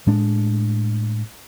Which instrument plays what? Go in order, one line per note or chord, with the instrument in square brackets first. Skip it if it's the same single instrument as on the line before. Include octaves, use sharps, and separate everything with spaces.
[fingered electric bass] A2 G#3 D4